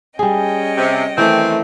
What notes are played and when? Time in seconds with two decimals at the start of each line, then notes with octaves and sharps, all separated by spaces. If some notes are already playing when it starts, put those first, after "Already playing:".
0.19 G3 C#4 G#4 D#5 G5
0.77 C3
1.18 D#3 E3 A3 C4